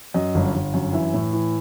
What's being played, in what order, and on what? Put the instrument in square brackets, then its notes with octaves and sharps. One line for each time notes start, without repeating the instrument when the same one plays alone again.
[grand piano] F#2 D#5
G1
G1
F#2
E3 E5
A2
E3